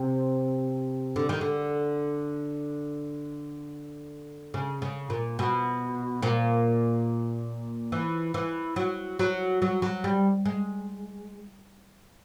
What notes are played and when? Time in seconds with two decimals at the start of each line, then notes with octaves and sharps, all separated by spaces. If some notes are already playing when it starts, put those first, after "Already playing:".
Already playing: C3
1.16 D3
1.29 D#3
1.41 D3
4.54 C#3
4.82 C#3
5.10 A#2
5.39 B2
6.22 A#2
7.92 E3
8.34 E3
8.76 F#3
9.19 F#3
9.62 F#3
9.82 F#3
10.04 G3
10.46 G#3